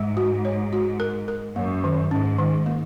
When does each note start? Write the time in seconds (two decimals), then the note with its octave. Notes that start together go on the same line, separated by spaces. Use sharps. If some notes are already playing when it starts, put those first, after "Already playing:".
Already playing: G#2 G#3
0.17 F#4
0.45 C#5
0.73 F#4
1.00 A#4
1.28 A#4
1.56 F#2 A#3
1.84 D#3
2.11 G#2 C#4
2.38 D#3
2.66 A#3